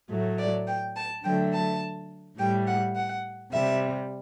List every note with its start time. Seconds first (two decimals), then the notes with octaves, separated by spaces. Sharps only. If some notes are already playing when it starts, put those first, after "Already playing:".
0.10 A2 F#3 A3
0.38 D5
0.67 G5
0.96 A5
1.24 D3 F#3 A3 G5
1.53 A5
2.38 A2 G3 G5
2.67 F#5
2.96 F#5
3.53 C3 G3 E5